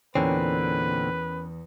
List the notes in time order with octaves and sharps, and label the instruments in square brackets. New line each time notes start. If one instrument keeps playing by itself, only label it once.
[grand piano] E2 [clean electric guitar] A#2 D3 C4 [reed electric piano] C#4 A#4 G5 [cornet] B4